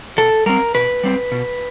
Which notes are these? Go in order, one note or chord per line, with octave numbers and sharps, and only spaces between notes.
B2 A4
G3 C4 A#4
B2 B4
G3 C4
B2